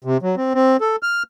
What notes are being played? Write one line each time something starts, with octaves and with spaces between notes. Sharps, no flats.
C3
F#3
C4
C4
A4
F6